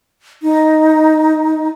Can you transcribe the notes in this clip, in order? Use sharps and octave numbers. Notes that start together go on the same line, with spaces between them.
D#4